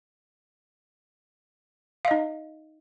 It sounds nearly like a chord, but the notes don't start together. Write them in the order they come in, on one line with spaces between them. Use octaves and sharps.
F5 D#5 D#4